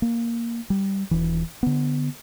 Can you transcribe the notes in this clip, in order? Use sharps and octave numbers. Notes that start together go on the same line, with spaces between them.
A#3
G3
D#1 E3
D3 B3